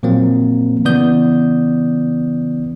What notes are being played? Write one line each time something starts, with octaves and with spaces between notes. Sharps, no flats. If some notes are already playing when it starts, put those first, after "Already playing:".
A#2 F3 F#3 A#3 C4
C#3 E3 B3 D5 D#6 G6